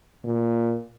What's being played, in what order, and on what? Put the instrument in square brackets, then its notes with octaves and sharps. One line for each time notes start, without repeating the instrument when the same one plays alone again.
[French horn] A#2